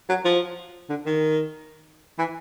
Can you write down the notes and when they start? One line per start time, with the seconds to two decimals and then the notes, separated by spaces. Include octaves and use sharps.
0.09 F#3
0.25 F3
0.89 D3
1.06 D#3
2.18 E3